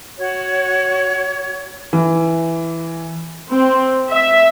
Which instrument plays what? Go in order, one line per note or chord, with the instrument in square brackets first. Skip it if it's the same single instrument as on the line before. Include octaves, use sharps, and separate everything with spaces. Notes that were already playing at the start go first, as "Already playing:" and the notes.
[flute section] F#4 C#5
[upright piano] E3
[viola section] C4
E5